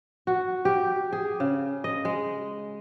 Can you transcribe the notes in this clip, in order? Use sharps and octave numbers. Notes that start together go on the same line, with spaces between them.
F#4
G4
G#4
C#3
D#5
G#3